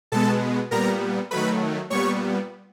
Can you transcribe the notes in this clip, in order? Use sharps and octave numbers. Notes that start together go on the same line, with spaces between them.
B2 G#3 B3 A4 A5
A#2 G3 B3 A#4 A#5
D#3 F#3 A3 B4 B5
A#2 G3 B3 C#5 C#6